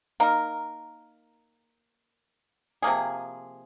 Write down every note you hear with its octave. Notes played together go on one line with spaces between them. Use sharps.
A#3 D#4 A#4
C3 F3 A#3 G#4